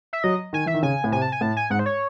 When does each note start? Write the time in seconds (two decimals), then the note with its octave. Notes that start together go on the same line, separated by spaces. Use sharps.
0.13 E5
0.24 F#3 D#5
0.53 D#3 G#5
0.66 E3 E5
0.74 D#3
0.83 C#3 G#5
1.04 A2
1.12 C3 G#5
1.22 A5
1.32 G#5
1.41 A2 A5
1.57 G#5
1.70 G#2 F#5
1.79 C5
1.86 C#5